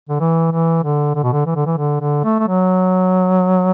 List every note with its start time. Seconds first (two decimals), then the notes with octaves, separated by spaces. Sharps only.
0.09 D3
0.20 E3
0.51 E3
0.83 D3
1.15 D3
1.23 B2
1.32 D3
1.46 E3
1.55 D3
1.66 E3
1.77 D3
2.01 D3
2.24 A3
2.39 A3
2.48 F#3